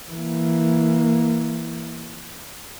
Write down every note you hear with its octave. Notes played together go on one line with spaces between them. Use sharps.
E3 A#3